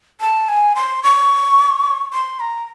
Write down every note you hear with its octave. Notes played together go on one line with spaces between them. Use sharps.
A5
G#5
C6
C#6
C6
A#5